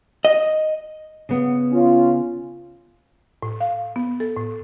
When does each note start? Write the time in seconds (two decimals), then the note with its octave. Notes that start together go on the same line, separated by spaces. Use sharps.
0.25 D#5
1.29 C#3 B3
1.73 C#4 F4
3.42 A2
3.60 F5
3.96 B3
4.20 A4
4.37 A2